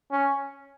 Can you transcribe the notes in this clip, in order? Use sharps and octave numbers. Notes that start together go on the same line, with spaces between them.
C#4